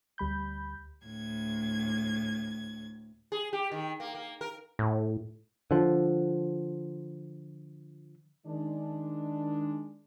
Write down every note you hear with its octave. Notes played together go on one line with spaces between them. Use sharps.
D2 G3 B5 G6
D2 A2 G#6
G#4
G4
D#3
A#3
A#3
A#4
A2
D3 F3
D#3 G#3 D4